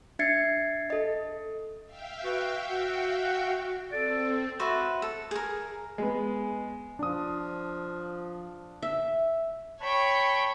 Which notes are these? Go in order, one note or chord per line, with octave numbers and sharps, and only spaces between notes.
D4 E5 G#6 A6 C7 C#7
A4 D#5
E5 F5 G5
F#4 B4
F#4 F#5
C4 A4 D5
F#4 B4 C5 E5
A4
G#4 A#4
G#3 B3
F3 D4 D#6
E5
C#5 G5 A5 B5 C#6